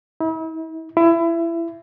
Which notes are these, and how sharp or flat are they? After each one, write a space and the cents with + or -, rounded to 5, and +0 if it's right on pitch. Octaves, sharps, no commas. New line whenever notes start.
E4 -40
E4 +25